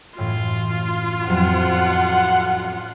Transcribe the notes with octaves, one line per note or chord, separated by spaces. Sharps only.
F#2 A2 E3 F4
F2 F#3 C4 F#5